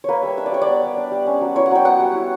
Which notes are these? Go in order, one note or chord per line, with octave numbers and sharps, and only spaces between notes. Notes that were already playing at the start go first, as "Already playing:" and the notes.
A#3 B4 C#5
G3 E5
D4 E5
D5
G3 C#5
D5
B3
G3
D4
G3
C#4
F#3
E4 C#5
F#5
F#3 G5
B3 F#5
G3
E4